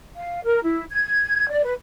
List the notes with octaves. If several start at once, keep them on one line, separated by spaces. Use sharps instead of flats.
F5
A#4
E4
G#6
D5
B4